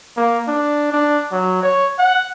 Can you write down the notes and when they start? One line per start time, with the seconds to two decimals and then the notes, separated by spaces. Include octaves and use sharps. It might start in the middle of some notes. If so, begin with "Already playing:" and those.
0.17 A#3
0.48 D4
0.92 D4
1.32 F#3
1.63 C#5
1.99 F#5